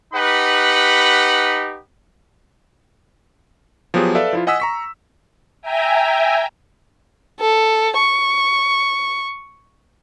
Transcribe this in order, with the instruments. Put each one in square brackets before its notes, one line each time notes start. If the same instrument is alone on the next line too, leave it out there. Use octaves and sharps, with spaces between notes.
[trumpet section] D#4 G4 B4 F#5 B5
[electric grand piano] F3 F#3 B3 G4 G#4
A4 B4 D5 E5 F5
F3 E4 F4
D#5 F#5 G#5 D#6 E6 B6
A#5 C#6 B6
[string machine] E5 G5 G#5 A#5
[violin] A4
C#6